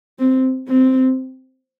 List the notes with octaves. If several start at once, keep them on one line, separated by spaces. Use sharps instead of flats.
C4
C4